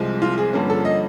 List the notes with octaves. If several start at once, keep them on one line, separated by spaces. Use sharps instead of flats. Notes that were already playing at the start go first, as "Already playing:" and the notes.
Already playing: C2 C3 F3 G#3 C4
F4
G#4
G2 D3 F3 A#3 C#4
A4
D#5